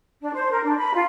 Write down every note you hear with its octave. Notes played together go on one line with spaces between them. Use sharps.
D4
C5
A#4
D4
B5
F4